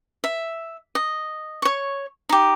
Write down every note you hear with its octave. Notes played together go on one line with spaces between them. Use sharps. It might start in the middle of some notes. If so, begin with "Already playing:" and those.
E5
D#5
C#5 C#6
D#4 G4